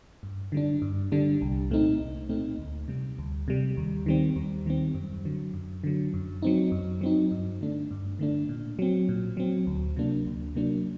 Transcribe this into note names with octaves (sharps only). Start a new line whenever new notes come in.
G2
D3 G3 D4
G2
D3 G3 D4
C2
A#2 A3 C4 D#4
C2
A#2 A3 C4 D#4
D2
C3 G3
D2
C3 G3
D#2
D#3 G3 C4
D#2
D#3 G3 C4
F#2
D3 F#3
F#2
D3 F#3
F#2
F#3 C4 D#4
F#2
F#3 C4 D#4
G2
D3 A3 D4
G2
D3 A3 D4
A#2
F#3 C4
A#2
F#3 C4
D2
C3 F#3 A#3 D4
D2
C3 F#3 A#3 D4